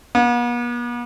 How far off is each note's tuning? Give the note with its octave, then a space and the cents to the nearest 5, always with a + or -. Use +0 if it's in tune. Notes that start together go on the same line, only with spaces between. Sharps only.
B3 -45